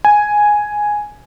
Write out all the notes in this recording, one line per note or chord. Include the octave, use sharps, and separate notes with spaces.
G#5